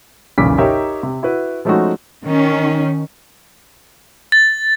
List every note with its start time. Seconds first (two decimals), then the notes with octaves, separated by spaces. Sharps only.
0.38 B1 E2 A#2 C#3 D6 B6
0.58 D#4 G4 A#4 C#5 E5
1.03 C3
1.23 E4 F#4 B4
1.65 F3 G#3 A3 C#4 D#4 F#4
2.24 D#3 C#4
4.32 A6